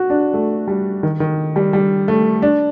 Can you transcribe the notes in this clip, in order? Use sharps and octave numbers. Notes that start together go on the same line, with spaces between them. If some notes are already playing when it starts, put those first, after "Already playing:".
Already playing: F#4
D4
A3
G3
D#3
D#3
G3
G3
A3
D4